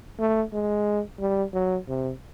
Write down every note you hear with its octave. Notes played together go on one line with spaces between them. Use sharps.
A3
G#3
G3
F#3
C3